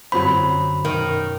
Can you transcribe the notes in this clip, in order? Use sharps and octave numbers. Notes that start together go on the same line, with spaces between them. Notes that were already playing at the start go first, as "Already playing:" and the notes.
F#2 D3 F#3 C4 C5 B5
F#2 B2 D#3